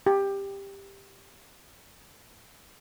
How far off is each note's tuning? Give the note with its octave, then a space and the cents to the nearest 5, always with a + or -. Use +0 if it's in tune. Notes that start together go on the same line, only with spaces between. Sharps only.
G4 +10